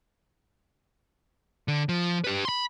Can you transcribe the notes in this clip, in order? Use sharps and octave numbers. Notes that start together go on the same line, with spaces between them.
D3
F3
G4 B4
B5 C6